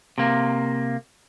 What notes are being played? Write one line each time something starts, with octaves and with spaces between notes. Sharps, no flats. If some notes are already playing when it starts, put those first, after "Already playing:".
C3 A#3